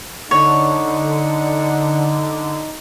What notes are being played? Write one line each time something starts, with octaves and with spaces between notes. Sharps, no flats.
D3 D4 D#4 C#5 F#5